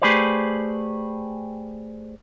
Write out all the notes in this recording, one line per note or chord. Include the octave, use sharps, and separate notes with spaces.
A3 G4 G#4 B4 C5 D5